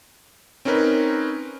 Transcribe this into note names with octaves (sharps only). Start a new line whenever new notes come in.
C4 C#4 D#4 A#4 B4